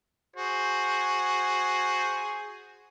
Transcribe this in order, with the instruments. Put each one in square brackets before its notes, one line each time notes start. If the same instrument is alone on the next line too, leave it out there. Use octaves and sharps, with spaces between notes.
[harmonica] F#4 G#4 [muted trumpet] C5